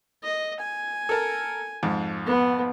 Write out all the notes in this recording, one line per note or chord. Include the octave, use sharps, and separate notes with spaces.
D#5
G#5
A4 A#4 A5
F2 G#2
B3